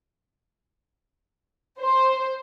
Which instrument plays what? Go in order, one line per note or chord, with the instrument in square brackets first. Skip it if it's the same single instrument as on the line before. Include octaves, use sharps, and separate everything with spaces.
[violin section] C5